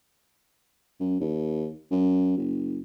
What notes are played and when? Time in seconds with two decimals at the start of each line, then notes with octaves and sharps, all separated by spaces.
1.00 F#2
1.21 D#2
1.91 F#2
2.38 F#1